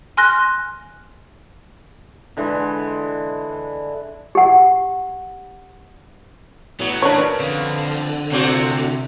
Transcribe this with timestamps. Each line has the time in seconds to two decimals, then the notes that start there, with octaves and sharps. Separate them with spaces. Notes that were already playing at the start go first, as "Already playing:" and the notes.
0.17 G#5 C6 F6 F#6 A#6
2.37 D3 E3 G#3
4.35 G4 F#5
6.80 A2 E3 F#3 B3
7.02 C#3 D4 A#4 B4 C#5
7.40 D3 C4 F4
8.32 A2 C3 C4 F#4